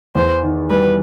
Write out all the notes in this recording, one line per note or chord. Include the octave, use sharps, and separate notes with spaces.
E2 C5
D#3
G3 B4